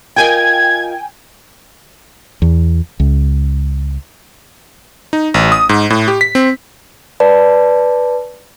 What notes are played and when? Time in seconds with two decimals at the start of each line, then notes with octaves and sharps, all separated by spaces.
0.16 F4 A#4 D#5 G5 G#5 G#6
2.42 E2
3.00 C#2
5.13 D#4
5.34 A1
5.52 D#6
5.69 G#2
5.90 A2
6.08 G4
6.21 B6
6.35 C4
7.20 B4 D5 A5